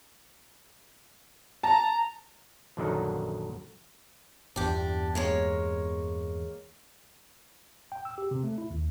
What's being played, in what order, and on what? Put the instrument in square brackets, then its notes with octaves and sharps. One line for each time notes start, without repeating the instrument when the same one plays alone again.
[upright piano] A5 [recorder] A#5
[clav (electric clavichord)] A#1 F#2 D3 D#3 F#3 D#4
[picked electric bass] G1 E2 [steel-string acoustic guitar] D4 G4
[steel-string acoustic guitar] G#3 A#3 C#5
[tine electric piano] G5
E6
G4
C3
A3
E4
D#2